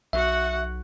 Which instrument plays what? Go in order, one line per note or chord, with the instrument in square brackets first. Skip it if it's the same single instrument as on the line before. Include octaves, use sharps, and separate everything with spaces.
[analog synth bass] B1 [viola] F#4 F#5 [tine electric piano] E5